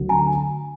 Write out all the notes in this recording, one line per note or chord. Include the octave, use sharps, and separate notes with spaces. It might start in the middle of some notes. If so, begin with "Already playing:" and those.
Already playing: D2 D3 F#3
G#5 A#5